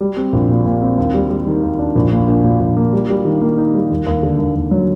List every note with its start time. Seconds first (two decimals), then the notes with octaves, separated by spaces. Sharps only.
0.01 G3
0.17 C4
0.33 A#1
0.49 A#2
0.65 A#2
0.82 C4
0.98 D#2
1.14 G3
1.30 G3
1.47 D#3
1.63 D#2
1.79 D4
1.95 A#1
2.12 A#2
2.28 A#1
2.44 A#2
2.60 A#1
2.77 A#3
2.93 G3
3.09 G3
3.25 D#3
3.42 A#3
3.58 D#4
3.74 G3
3.90 D#2
4.07 D#2
4.23 D3
4.39 D#2
4.55 D#2
4.71 F#3